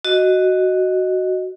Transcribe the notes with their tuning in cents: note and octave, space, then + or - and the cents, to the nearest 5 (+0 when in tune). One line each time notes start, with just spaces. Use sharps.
F#4 +5 D#5 +0